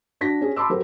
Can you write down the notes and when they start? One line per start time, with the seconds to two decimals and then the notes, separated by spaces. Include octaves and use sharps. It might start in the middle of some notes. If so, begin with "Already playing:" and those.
0.21 D4 F#4 A#6 B6
0.41 C#4 G4 G#4
0.56 A5 B5 C6 D6 E6
0.70 F#3 G4 A4 A#4 C5